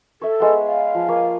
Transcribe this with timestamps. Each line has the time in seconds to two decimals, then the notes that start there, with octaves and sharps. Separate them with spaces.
0.22 A4 C#5 E5
0.40 G#3 B3
0.67 F5
0.95 F3
1.08 A#3 C#5